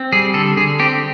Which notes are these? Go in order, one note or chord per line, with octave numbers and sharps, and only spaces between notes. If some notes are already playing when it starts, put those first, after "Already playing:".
Already playing: C4
G3 G#4
D3 A4
D3 G#4
C4 G4